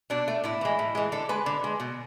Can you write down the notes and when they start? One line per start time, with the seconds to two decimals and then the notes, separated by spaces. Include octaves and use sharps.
0.10 B2 D4
0.28 A3
0.44 A2 E4
0.61 E3 G#3
0.79 A2
0.95 E3 G#3
1.12 D3 A4
1.29 G#3 B4
1.46 D3
1.64 G#3
1.80 B2